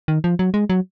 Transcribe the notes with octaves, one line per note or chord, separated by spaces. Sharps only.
D#3
F3
F#3
G#3
F#3